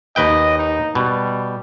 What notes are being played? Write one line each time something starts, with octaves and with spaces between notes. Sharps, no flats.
D#2 B4 D#5 G5
D#4
B2 G3